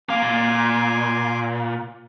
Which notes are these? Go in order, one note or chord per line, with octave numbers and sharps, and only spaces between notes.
A#3 F5 G#5 C6 D6
A#2